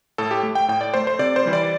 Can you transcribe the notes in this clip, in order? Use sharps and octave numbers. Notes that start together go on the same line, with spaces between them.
A2 A4
G4
A3
G5
A2 G5
D5
A3 C5
C5
C3 D5
C5
E3 G3
D5